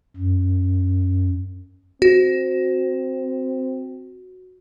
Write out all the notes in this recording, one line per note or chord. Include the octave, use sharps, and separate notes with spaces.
F#2
C4 F#4